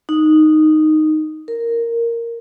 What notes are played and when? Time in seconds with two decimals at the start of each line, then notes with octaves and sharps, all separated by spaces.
0.09 D#4
1.48 A#4